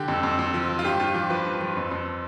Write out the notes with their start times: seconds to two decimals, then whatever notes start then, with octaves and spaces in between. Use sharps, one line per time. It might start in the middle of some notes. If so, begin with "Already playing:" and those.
Already playing: D3 G4
0.08 F2
0.23 F2
0.39 F2
0.54 F3
0.69 F3
0.79 F4
0.85 G2 G4
1.00 G2 F4
1.14 F3 G4
1.30 F3 B4
1.46 G2
1.61 F3
1.77 F2
1.91 F2